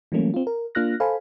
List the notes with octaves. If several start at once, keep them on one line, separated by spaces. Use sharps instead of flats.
E3 F#3 G3 A3 A#3 C#4
C4 F4
A#4
A#3 D4 F4 F6 F#6 A#6
A4 C5 F5 G#5 B5